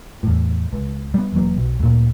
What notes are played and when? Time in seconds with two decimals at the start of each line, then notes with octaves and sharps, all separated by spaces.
0.23 E2 A2
0.73 C#2
1.14 G3 B3
1.32 E1 E3 F#3 A#3
1.57 B1
1.80 D2 A#2